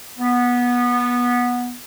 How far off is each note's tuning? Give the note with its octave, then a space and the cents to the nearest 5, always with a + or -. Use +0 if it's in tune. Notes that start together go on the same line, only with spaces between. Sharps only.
B3 -15